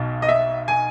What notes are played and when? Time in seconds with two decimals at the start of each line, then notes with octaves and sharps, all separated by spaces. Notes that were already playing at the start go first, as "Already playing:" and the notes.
Already playing: B1 B2
0.22 D#5
0.29 E5
0.68 G#5